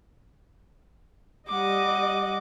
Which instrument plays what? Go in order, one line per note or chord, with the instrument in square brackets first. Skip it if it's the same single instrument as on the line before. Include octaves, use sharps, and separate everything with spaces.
[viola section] G3 D#5 [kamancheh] F#5 D6